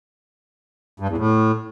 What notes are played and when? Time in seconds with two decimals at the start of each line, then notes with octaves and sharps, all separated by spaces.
1.00 G2
1.09 E2
1.18 A2